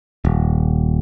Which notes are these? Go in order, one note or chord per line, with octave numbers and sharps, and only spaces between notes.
D#1